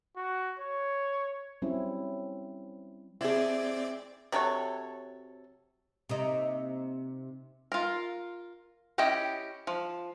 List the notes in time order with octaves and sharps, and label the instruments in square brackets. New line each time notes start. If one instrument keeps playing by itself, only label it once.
[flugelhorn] F#4
C#5
[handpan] F#3 G3 C4 C#4 E4
[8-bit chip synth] C4 D5 [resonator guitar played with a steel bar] E4 G#4
[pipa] C3 F#3 A4 C#5
[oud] C3 A#3 D#4
[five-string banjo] F4 A#4
C#4 E4 G4 D#5 G5
F3